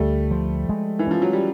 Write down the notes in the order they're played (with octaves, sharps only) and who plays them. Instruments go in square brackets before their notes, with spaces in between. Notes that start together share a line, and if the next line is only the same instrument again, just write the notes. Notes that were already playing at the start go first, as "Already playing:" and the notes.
Already playing: [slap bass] D2 [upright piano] G3 A3
[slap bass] F3
G#3
[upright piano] E3
[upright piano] F3 [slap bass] C#4
[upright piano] F#3
G3